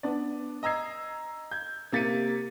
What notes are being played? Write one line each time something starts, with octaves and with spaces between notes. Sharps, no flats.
B3 D4 D5
D#5 A#5 E6 G#6 C7
G6 G#6
C3 A#3 A6 B6 C#7 D#7